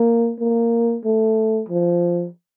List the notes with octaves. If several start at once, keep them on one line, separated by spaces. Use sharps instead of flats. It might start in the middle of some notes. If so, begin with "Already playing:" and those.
Already playing: A#3
A#3
A3
F3